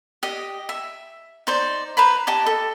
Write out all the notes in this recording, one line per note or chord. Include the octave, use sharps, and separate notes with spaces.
G4 D#5
E5
D#4 C5 D5
B4 C5 A#5 B5
G4 D#5 A5 D6
A4